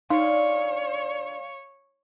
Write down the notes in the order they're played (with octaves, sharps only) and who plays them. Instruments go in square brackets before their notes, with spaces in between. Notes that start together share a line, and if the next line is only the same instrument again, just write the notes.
[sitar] A#2 D4 [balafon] D#4 [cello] C#5 [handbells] F5